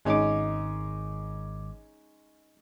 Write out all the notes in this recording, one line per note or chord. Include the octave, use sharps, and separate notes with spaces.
G#1 G#3 C#4 D#4 D6